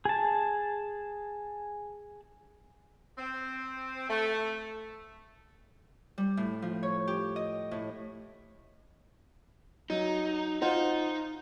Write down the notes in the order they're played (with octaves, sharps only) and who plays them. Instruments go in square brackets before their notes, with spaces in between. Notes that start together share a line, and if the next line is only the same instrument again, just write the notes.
[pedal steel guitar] G#4 A5
[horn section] C4
A3
[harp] G3
A2
F3
C#5
G4
D#5
A2
[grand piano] F#3 [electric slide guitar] D#4
[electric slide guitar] D#4 [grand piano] F4 C5 F#5